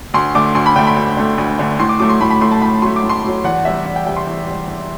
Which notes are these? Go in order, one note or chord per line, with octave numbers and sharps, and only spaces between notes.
D2 C6
D3 A3 D6
D2 C6
B5
D3 A3 G5
B5
D2
D3 A3
D2
D3 A3
A2 C6
D6
F#3 A3 D6
C6
A2 B5
B5
F#3 A3 C6
A5
A2 B5
F#3 A3 C6
D6
A2
C6
F#3 A3
E2 F#5
C3 G3 E5
E2 F#5
G5
C3 G3 G5
C6
E2
C3 G3
E2